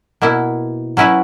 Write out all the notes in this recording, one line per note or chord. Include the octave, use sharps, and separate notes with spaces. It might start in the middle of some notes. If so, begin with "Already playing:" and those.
B2 A#3 E4
F#3 C#4 E4 B4